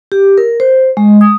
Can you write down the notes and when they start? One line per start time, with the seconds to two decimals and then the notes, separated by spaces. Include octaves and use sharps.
0.12 G4
0.38 A#4
0.60 C5
0.97 G#3
1.21 D#6